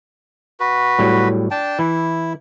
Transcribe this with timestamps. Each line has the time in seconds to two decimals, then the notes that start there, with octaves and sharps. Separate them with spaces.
0.60 F#4 B4
0.99 A2 F#3 G3
1.51 D4 G5 A5
1.79 E3 E4